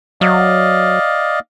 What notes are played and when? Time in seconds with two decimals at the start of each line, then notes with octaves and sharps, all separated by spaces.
0.21 F#3 D5 D#5 F5